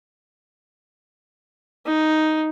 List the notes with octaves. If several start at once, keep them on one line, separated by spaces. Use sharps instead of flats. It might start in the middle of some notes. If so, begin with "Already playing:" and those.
D#4